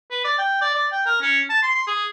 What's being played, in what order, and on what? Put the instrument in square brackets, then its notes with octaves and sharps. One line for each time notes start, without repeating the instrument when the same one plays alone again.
[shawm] B4
D5
G5
D5
D5
G5
A#4
C#4
A5
C6
C6
G#4